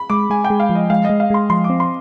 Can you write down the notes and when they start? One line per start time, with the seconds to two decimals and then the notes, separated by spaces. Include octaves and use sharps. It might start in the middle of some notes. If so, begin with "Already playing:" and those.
Already playing: B5
0.10 G#3 D6
0.30 G#3 G#5
0.45 G5
0.50 G#3
0.60 F5
0.69 F3
0.75 D#5
0.90 G#3 F5
1.05 D#5
1.10 G#3
1.20 F5
1.30 G#3 C6
1.50 F3 C6
1.64 D6
1.69 C4
1.80 C6